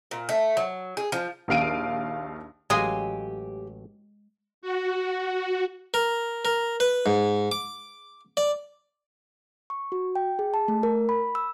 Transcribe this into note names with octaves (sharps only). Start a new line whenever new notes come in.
A#2
A3
F#3
G#4
F3
A#1 D#2 F5 D7 D#7
A1 F#3 G#3 G4 D#5 F5 G#5
F#4
A#4
A#4
B4
G#2
D6
D5
C#6
F#4
G5
G#4
A5
A3
A#4
B5
E6